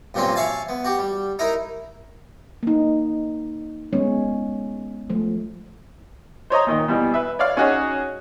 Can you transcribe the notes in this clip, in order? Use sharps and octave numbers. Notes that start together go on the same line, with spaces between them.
G2 A#2 F#3 C4 C#4
C#5 E5 F5 G#5 A5
B3
F#4 G4
G3
D#4 E4 A#4
A#3 D#4
G#3 B3 C#4 C#5
F3 A3
C5 C#5 D#5 A#5
A#2 D#3 D#5
B2 E3 G3
B4 E5
C#5 D5 F5
C#4 D#4 F#4 G#4 C#5